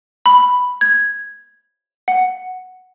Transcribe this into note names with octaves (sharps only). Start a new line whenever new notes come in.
B5
G#6
F#5